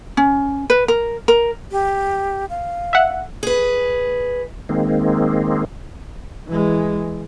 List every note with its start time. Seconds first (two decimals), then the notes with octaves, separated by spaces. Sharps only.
0.17 C#4
0.70 B4
0.88 A#4
1.28 A#4
1.71 G4
2.50 F5
2.93 E5 F#5
3.43 G#4 B4
4.69 D#3 G#3 A#3 C4
6.48 E3 G#3